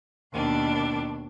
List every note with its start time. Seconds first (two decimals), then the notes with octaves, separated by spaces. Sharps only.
0.33 D#2 B2 D4